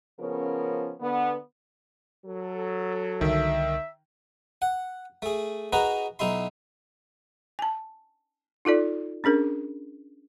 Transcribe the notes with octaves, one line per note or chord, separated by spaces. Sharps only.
C#3 F3 B3 C#4 A#4
D3 B3
F#3 A4
C2 D3 D#3 E5
F#5
A3 G#4
D#4 F#4 G#4 A#4 B4
B1 D#4 E4 C6
G#5 A5
D#4 F4 A4 D5
C#4 D4 G#4 A#4